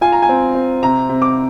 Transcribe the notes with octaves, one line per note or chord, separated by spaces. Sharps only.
F4 G#5
A#5
G#5
C4
C4
C3 A#5
C3
D6